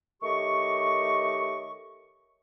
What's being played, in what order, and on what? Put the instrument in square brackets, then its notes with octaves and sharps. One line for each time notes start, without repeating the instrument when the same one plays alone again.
[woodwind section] D#3 A3 G4 C#5 D#5 C#6